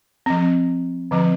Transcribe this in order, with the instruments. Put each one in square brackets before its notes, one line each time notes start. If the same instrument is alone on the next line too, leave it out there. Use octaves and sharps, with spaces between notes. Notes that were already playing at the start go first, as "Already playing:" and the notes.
[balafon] F3 C4
D3 F3 C4